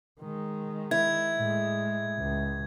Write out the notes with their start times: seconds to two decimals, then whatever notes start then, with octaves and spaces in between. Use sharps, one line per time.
0.21 D#3 G#3
0.91 E4 G#6
1.37 A2 G#3
2.18 C#2